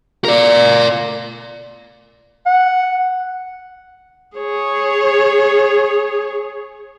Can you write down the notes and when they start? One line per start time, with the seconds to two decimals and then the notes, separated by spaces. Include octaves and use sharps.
0.25 A#4 D5
2.46 F#5
4.37 G#4 C#5